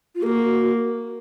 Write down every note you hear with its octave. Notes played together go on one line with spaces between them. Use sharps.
F4
A#3 F#4 A#4